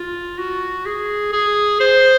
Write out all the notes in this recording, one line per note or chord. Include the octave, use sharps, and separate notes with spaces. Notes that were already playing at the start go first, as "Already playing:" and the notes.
Already playing: F4
F#4
G#4
G#4
C5